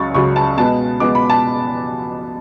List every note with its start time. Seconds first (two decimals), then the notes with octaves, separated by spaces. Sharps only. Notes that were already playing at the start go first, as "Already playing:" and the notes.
Already playing: C#2 C#3 F#3 C#6 A6
0.14 C#2 C#3 F#3 C#6
0.36 A5
0.57 B2 G#3 B3 A5
1.00 B2 G#3 B3 D6
1.15 B5
1.30 A5